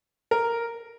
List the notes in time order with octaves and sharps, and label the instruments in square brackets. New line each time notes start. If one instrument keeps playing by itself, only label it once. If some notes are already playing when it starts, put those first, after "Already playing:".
[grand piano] A#4